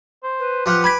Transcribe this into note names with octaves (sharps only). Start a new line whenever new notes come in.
C5
B4
F3 F4 G4 F#5
G#5 B5 D6 G#6 B6